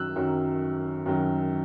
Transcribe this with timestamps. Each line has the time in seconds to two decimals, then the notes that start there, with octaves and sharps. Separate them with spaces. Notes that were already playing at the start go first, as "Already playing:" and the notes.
Already playing: F#2 D#3 F#3 E6 F#6
0.16 F#2 D#3 F#3
1.06 F#2 D#3 F#3